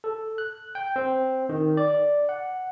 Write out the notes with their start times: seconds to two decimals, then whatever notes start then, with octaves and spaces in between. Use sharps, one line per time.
0.04 A4
0.38 F#6
0.75 G5
0.96 C4
1.49 D#3
1.77 D5
2.29 F#5